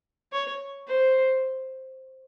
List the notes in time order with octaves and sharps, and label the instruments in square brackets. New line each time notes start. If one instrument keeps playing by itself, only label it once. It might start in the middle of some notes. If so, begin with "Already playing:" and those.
[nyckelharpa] C#5
C5